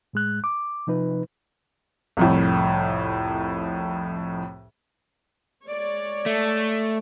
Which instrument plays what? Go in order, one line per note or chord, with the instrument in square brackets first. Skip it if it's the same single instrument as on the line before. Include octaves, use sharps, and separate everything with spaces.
[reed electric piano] A2 G#3 F#6
D6
C3 F3 D#4 B4
[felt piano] C2 F2 A2
[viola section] G#3 C#5 D5
[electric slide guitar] A3